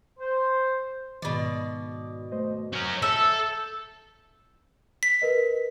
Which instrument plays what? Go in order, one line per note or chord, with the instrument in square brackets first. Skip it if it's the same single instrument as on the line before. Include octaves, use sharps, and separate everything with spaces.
[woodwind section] C5
[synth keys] G#2 D#3 [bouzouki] B2 D5
[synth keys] A3 C5 D#5
[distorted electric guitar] C#4 A#4 [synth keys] G6
[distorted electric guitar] A4 [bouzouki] E5
[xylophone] B6
[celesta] A#4 B4 D#5